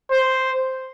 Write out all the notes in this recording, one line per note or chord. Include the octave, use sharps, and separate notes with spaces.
C5